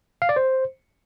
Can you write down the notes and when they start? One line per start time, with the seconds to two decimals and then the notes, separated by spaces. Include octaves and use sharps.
0.22 F5
0.29 D5
0.36 C5